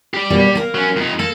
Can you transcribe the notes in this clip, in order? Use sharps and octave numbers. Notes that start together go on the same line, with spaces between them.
G4 D5
B2 G3 A#3
A#3 A#4
F#3 C#4
F2 D#4
A#3 A4